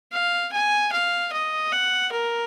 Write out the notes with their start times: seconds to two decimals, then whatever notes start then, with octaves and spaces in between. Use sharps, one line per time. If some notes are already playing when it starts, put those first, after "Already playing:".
0.12 F5
0.52 G#5
0.92 F5
1.33 D#5
1.72 F#5
2.12 A#4